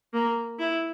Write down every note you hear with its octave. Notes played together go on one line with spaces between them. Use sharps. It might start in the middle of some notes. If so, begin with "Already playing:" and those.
A#3
E4